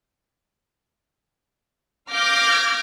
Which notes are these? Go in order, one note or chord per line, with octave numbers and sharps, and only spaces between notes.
F5 D6 F6 G6 G#6 A#6